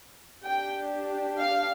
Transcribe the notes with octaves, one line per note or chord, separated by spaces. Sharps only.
D4 G4 G5
F5